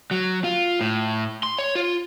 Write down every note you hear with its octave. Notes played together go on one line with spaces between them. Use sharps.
F#3
F4
A2
C6
C#5
F4